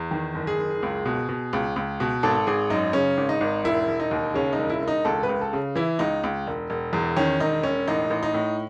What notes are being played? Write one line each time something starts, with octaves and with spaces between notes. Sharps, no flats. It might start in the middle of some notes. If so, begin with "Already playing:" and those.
Already playing: E2
D#3
F#1
G#4
F#1
C#2
B2
B2
C#2
C#2
B2
G#1 A4
G#1 G#4
F#2 D#4
C#3 C#4
G#1
D#4
G#1
E1 E4
E1
D#4
D#2
C#3 C#4
D#4
E1
E4
E1
D#4
C#2 A4
B4
C#2
A4
C#3
E3 E4
C#2 D#4
C#2
E1
E1
E2
D#3 C#4
E1 D#4
E1 C#4
A1 D#4
A1
D#4
A2